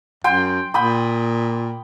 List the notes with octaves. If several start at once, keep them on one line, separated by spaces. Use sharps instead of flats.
F#2 G5 C6
A#2 G5 B5 D#6